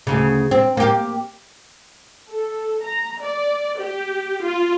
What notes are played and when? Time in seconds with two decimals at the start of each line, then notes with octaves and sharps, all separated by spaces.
0.07 D2 C#3
0.51 C4
0.77 A#3 G4
2.31 A4
2.82 A#5
3.21 D5
3.77 G4
4.44 F4